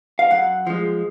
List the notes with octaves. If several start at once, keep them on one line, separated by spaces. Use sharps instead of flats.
F5
F#2 F#5
F3 G#3